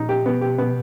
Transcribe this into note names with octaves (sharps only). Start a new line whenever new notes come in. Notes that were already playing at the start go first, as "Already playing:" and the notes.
Already playing: A#2 D#4
G4
B2 B3
G4
B3